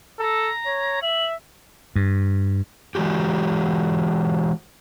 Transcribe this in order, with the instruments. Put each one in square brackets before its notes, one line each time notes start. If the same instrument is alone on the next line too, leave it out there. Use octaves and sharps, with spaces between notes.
[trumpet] A4 [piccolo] A#5
[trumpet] C#5
[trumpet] E5 [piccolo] F#7
[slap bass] G2
[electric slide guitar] E3 G#3 F#4 G4